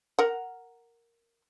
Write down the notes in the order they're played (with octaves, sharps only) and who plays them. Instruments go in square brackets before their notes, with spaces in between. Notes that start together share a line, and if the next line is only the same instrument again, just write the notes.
[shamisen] A#4 F#5